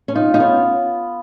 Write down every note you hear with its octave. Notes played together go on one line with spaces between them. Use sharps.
C#4
D#4 F4
D#4
B3 C#4